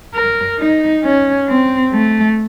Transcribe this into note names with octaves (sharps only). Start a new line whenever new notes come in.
A#4
D#4
C#4
C4
A3